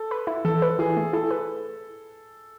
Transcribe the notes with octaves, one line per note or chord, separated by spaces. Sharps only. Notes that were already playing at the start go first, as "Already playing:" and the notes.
Already playing: A4
B4
E4
E3 A4
B4
E3 G#4
A3
E4 A4
B4